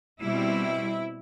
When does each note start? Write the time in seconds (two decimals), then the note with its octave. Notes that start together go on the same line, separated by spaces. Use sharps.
0.22 B2 G3 C4 E4